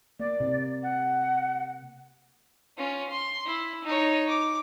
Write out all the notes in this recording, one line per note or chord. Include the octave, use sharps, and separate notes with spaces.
A#3 D5
C3
F#5
C#4 F4
C6
E4
D#4 C#5
D6